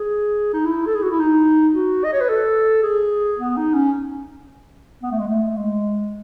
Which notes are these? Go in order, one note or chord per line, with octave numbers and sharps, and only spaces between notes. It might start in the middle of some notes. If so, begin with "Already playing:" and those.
Already playing: G#4
D#4
E4
A4
G#4
F#4
E4
D#4
F#4
D#5
C#5
B4
A4
G#4
B3
D#4
C#4
B3
A3
G#3
A3
G#3